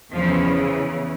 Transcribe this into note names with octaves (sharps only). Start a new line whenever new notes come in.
E2 C#3 E3 F3